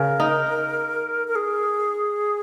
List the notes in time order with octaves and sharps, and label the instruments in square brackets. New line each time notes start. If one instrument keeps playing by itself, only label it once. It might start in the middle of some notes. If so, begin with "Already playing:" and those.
Already playing: [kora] C#3 [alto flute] A#4
[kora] D#4
[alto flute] A#4
G#4